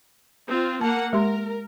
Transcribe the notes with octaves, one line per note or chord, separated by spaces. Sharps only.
C4 F4
A#3 F#5 A5
G#3 G4 A#4 C6